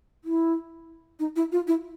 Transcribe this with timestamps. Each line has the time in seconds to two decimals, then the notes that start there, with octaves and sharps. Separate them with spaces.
0.24 E4
1.19 D#4
1.36 E4
1.52 F4
1.67 E4